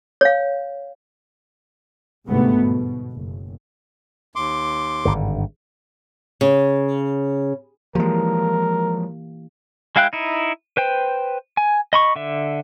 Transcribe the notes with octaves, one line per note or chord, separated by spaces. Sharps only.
C#5 F5
G1 D2 G#2 C3 A3 B3
B2
F#1
D#2 C6 D6
G#1 G2 D3
C#3
E3 F3 G#3 A#3 G4 A#4
G#3 E4 F5 G5 F#6
D#4 E4
B4 C5 G5
G#5
D#5 B5 C#6
D3 E5